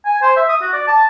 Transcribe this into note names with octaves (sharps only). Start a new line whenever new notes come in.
G#5
C5
E5
D#6
F#4
D5
A5